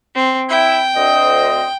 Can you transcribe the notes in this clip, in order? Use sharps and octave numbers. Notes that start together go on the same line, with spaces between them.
C4
E4 G5
D2 C4 D#5